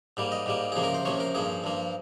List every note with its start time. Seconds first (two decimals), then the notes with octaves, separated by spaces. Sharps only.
0.17 G#2 G3 A#3
0.32 D#5
0.46 G#2 G3 A#3
0.72 C#2 C3 F3 A#3 G#4
0.83 A#4
0.94 C5
1.05 C#2 C3 F3 A#3 C#5
1.20 A#4
1.35 G2 F3 A#3 G#4
1.64 G2 F3 A#3